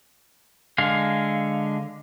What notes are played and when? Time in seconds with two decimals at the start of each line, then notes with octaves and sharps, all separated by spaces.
0.78 D3 G#3 F5